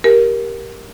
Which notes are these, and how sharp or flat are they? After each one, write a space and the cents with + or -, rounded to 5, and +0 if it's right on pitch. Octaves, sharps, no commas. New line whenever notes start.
G4 +0 A#4 +10